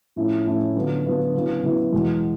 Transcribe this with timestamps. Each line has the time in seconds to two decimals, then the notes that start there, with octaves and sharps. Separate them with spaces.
0.16 A2 F3 A3 C#4 E4
0.46 A2 F3 A3 C#4 E4
0.76 D3 F#3 B3 D4 F4
1.05 D3 F#3 B3 D4 F4
1.35 C#3 F#3 B3 E4
1.63 C#3 F#3 B3 E4
1.92 E2 B2 G#3